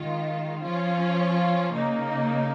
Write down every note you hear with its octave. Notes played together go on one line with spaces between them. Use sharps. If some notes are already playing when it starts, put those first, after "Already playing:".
Already playing: D#3 G#3 F4
F3 C#4 F4
C#3 A#3 D#4